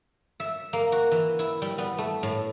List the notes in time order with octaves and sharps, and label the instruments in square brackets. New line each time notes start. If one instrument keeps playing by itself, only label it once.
[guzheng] E5
A#3
F#4
E3
E4
G3
B3
A3
A2